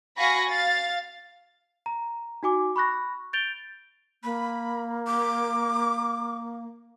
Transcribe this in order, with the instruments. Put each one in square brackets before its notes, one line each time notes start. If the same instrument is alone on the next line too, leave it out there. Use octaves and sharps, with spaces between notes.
[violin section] F#4 F5 G#5 B5 C#6 A#6
F5 A6
[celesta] A#5
D#4 F#4 G#5 D6
B5 C#6 F#6 A#6
G6 A6 D7 F7 G7
[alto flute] A#3 [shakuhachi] B5
[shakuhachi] D6